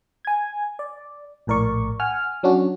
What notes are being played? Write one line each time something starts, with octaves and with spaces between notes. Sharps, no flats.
G#5 G#6
D5
A#1 A2 A#4 D5 C#6
F#5 G#5 F6
F#3 C#4 D4 F#4